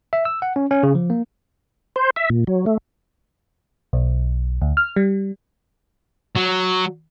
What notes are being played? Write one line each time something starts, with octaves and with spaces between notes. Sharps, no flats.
E5
E6
F#5
C#4
C#4
C#3
F3
A#3
C5
E5
A#2
F#3
A3
B1
D2
F6
G3
F#3